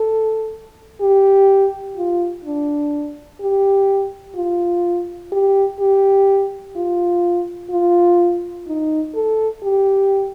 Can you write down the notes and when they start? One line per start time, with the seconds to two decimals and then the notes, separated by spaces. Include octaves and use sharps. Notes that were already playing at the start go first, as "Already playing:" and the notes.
Already playing: A4
1.01 G4
1.96 F4
2.45 D4
3.41 G4
4.36 F4
5.32 G4
5.80 G4
6.76 F4
7.71 F4
8.67 D#4
9.15 A4
9.64 G4